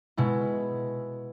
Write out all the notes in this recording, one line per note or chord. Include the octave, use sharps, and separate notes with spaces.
B2 G#3 E4